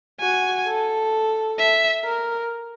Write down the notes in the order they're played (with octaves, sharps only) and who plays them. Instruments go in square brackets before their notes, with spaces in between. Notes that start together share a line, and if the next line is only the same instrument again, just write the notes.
[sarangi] F#4 [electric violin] G#5
[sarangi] A4
[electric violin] E5
[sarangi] A#4